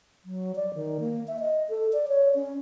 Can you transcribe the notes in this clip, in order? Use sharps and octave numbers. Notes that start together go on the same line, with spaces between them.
F#3
D5
D#3
A#3
E5
D#5
A4
D5
C#5
C#4